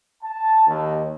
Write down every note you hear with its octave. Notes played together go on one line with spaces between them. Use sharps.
A5
D#2